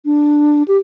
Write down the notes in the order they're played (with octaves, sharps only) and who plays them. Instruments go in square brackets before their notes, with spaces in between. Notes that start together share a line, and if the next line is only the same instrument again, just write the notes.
[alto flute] D4
G4